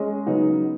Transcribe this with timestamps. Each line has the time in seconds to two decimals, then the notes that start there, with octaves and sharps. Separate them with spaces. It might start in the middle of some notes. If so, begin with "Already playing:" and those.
Already playing: G#3 C#4 G#4 D#5
0.26 C#3 F#3 B3 D#4